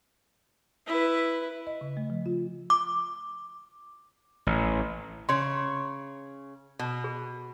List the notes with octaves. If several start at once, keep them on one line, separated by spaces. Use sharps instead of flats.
E4 B4
D#5
C#3
A3
F3
F4
D6
A1
C#3 C#5 C6
B2
G#4